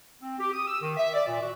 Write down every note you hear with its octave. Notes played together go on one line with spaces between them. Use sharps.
C4
G4
D#6
E6
D#3
E5
D5
A#2
F#4